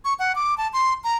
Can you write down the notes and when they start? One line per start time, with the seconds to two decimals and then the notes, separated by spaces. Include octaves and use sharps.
0.05 C#6
0.19 F#5
0.35 D6
0.58 A5
0.73 C6
1.04 A#5